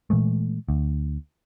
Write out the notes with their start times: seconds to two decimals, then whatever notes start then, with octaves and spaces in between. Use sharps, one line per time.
0.10 A#2 E3 G#3 A3
0.69 D2